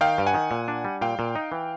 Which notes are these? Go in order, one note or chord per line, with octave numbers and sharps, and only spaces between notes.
D#3 F5 G5
G2
F#5 G#5
D#3
A#2
D4
G3
A#2 F5 G5
A#2
D#4
E3